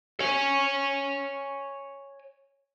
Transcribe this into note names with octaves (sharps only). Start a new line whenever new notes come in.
C#5 G#5